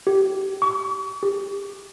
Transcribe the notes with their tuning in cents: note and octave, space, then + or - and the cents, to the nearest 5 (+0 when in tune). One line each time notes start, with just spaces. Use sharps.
G4 -20
C#6 +40
G4 +25